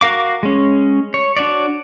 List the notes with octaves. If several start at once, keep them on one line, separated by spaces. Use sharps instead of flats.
F#4 A#4 F5 D6
G#3 C#4
C#5
D4 F#4 C#5 D5